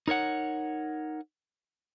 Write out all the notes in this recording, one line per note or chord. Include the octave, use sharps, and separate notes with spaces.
D#4 A#4 C#5 F#5